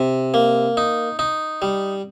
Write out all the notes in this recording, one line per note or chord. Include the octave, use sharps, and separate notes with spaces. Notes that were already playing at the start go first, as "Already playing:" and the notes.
Already playing: C3
A#3
D#4
D#4
G3